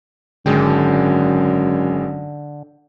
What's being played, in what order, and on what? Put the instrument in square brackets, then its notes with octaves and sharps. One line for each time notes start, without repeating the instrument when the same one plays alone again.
[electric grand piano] G#1 G#3 G5 [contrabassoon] F#2 [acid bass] D3